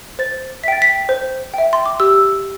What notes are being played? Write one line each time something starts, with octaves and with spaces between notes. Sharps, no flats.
C5 A6
E5 G5 A6 B6
B6
C5
E5 G5
C6
D6
G4 E6